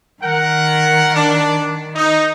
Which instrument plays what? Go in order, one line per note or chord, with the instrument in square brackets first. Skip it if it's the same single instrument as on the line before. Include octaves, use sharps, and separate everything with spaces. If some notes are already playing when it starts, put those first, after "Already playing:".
[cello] D#3 [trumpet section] A#4 F#5
[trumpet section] D4
D#4